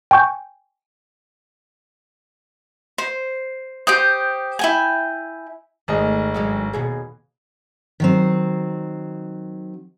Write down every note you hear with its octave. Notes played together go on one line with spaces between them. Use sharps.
G5 G#5 C#6 G6
C5
G4 C5 G5 D#6
E4 G5 G#5
G#1 D#3 A3 G#4 D#5
G2 F#3 G#3
D#2 B2 G#4
D#3 F#3 C4